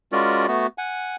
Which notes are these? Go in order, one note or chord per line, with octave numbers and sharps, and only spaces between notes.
G#3 C#4 F4 F#4 A#4 D5
A3 B3 F#4
F#5 G#5